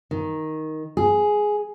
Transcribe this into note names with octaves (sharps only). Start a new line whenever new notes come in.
D#3
G#4